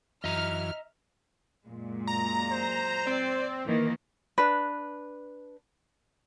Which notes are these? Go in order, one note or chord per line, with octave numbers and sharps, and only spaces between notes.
F#2 E3 D#5 E5 A#5 F6
F#2 A#2 G#3
A#5
C5
C4 D5
D#3 E3 A#3
D4 B4